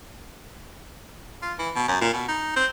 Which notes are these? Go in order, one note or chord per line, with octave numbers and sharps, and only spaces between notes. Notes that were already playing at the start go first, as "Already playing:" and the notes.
F4
E3
B2
F#2
A#2
B2
D#4
C4